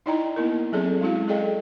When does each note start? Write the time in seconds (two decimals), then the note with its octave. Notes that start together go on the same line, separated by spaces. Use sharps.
0.06 D#4 E4 D5 D#5 G5 A#5
0.36 A#3 B3 E4 A#4
0.72 F#3 C4 C#4 G#4 A4 D5
1.01 G#3 C#4 E4 F#4 F5
1.28 G#4 A4 D5 D#5 F5 G5